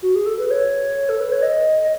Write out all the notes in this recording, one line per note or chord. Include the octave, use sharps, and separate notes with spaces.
F#4
G#4
A4
B4
C#5
A4
B4
C#5
D#5